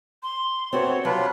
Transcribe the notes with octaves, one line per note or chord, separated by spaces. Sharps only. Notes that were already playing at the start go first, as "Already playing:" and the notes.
C6
A3 C4 F#4 B4 C#5 D5
F#3 G3 D4 F4 B4